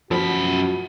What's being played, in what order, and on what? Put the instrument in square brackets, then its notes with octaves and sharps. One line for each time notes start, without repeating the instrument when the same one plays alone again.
[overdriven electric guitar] F#2 B5 [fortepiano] F3 [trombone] F#4